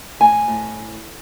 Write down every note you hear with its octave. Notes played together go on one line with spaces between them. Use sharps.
A2 G#5
A2